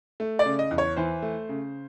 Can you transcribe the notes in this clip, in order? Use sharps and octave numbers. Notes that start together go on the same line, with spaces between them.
A3
D5
C#3
D#5
E2
C#5
E3 C5
A3
C#3